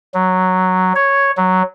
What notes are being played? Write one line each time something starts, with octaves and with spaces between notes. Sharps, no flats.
F#3
C#5
F#3